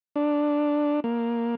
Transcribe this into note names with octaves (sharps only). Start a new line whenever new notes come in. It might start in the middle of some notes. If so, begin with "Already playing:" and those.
D4
A#3